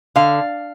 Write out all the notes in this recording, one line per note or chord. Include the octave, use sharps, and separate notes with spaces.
D3 F5